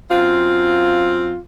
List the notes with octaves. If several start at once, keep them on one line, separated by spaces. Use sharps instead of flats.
F#2 C4 F4